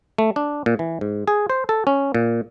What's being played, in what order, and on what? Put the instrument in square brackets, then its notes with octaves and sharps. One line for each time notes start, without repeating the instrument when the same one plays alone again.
[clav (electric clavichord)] A3
D4
A#2
E3
G#2
G#4
C5
A4
C#4
A#2